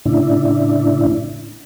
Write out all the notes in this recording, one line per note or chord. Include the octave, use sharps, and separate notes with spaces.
A2 C#3 D4 E4